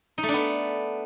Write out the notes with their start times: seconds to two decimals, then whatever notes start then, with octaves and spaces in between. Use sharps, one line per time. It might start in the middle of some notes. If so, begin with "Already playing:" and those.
0.18 D#4
0.23 A3
0.28 D4
0.34 B3